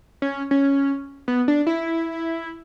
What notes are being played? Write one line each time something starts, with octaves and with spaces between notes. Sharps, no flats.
C#4
C#4
B3
D4
E4